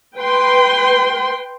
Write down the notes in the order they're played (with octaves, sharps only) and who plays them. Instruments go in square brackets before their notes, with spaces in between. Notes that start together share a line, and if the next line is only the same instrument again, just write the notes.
[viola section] B4 G5 C6